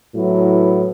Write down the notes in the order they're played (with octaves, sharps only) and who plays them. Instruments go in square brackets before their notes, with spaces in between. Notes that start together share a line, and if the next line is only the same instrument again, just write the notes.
[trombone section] A2 F#3 B3 E4